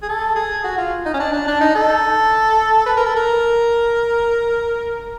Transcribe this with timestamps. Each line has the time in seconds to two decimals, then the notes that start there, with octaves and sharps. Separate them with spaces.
0.03 G#4
0.09 A4
0.36 G#4
0.64 F#4
0.78 F4
1.06 D#4
1.14 C#4
1.20 D4
1.33 D4
1.48 D4
1.61 D#4
1.76 A4
2.86 B4
2.97 A#4
3.06 A4
3.17 A#4